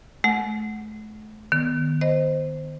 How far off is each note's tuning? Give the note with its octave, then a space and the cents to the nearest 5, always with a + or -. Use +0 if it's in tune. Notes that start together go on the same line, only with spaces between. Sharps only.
A3 -40 F#5 +0
D#3 -30 B3 +0
C5 +0 D#5 +0